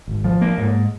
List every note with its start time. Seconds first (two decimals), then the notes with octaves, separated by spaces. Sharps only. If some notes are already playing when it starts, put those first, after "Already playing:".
0.08 G#1
0.24 F3
0.42 A#3
0.58 G#2